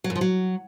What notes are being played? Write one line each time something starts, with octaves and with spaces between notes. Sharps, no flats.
F#3
F#2
F3
F#3